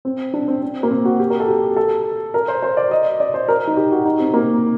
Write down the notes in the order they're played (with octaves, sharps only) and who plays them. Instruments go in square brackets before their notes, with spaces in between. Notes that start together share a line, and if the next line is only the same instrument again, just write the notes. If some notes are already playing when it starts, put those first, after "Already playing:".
[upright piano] C4
D4
C4
C4
A#3
C4
F#4
G4
A#4
A4
G4
A4
A#4
C5
C5
D5
D#5
D5
C5
A#4
D#4
G4
F#4
D#4
C4
A#3